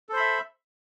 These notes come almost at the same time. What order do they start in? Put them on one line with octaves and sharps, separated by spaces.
A4 C5 B5 E5